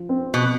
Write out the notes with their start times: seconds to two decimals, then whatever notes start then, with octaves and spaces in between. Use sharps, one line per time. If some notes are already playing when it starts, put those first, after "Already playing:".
Already playing: F3
0.09 C4
0.34 B2